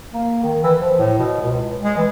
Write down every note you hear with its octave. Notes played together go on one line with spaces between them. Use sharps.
A#3
D#3
E3
F3
A2
B2
C#2
G#3
E3